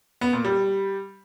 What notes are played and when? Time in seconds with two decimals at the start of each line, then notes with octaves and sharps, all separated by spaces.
0.21 B3
0.33 A#2
0.45 G3